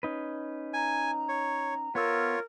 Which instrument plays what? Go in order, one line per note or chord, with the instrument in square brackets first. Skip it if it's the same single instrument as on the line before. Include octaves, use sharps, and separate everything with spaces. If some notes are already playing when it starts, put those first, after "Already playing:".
[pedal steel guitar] C#4 D#4 B4
[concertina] G#5 [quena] A#5
[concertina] C#5
[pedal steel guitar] B3 E6 [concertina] F4 C#5 [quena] A#4